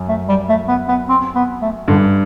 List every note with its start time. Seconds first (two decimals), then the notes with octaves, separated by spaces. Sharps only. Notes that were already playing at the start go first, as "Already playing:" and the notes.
Already playing: F#2
0.09 A3
0.29 G3
0.49 A3
0.69 B3
0.88 B3
1.09 C4
1.35 B3
1.61 A3
1.88 G2 D3